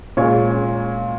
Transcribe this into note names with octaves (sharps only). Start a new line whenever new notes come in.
A#2 G#3 C#4 C#5